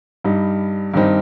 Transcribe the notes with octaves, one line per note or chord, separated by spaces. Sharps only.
G2 G3 D#4
G2 D#3 G3 C4 D#4